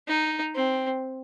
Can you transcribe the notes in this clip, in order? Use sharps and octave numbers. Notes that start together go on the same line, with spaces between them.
D#4
C4